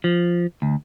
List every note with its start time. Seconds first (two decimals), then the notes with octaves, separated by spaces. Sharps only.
0.04 F3
0.62 D2